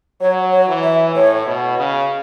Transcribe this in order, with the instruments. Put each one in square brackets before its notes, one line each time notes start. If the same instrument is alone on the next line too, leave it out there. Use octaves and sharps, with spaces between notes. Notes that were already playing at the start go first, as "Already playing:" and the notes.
[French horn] F#3 [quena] C#5
[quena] C#5
[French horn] E3
[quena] E5
[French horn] A2 [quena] C#5
[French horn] B2
C#3